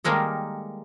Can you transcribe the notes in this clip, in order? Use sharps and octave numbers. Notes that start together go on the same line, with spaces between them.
D#3 G3 G#3 A#3 A4